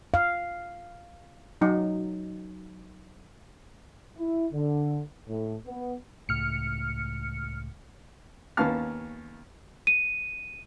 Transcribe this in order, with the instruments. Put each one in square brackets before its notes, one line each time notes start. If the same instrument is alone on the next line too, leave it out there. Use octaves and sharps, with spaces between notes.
[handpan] F5
[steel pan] F#3 D#4
[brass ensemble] E4
D3
A2
B3
[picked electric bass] C#2 A2 [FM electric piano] F6 C#7
[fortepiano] D#2 B3 C#4 F5 A5 F6
[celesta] D#7